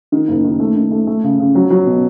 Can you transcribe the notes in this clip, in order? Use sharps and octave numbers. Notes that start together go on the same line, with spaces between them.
D#3
F#1
D#3
A3
D#3
A3
A3
C#3
C#3
F#3
F#3
B2